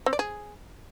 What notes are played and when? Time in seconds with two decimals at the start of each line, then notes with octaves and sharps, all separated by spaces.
0.06 C4
0.13 D5
0.19 G#4